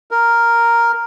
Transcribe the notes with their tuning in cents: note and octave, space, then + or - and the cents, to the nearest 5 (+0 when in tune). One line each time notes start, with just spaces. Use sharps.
A#4 +0